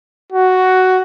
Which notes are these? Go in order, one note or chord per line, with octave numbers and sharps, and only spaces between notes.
F#4